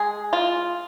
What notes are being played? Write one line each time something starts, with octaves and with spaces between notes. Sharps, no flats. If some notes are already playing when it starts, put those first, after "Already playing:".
Already playing: G#3 G#4
F4